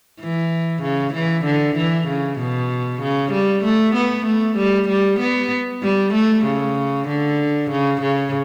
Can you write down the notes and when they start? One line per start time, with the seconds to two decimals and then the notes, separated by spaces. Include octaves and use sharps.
0.20 E3
0.83 C#3
1.14 E3
1.45 D3
1.77 E3
2.08 C#3
2.39 B2
3.02 C#3
3.33 G3
3.64 A3
3.95 B3
4.27 A3
4.58 G3
4.89 G3
5.20 B3
5.83 G3
6.14 A3
6.46 C#3
7.08 D3
7.71 C#3
8.02 C#3